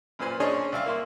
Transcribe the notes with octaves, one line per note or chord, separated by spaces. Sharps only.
F#2 A#2 B4 C5 G#5
C#4 D4 G#4 C5 C#5 D#5
C2 E5 F5 C#6
A#3 E4 C6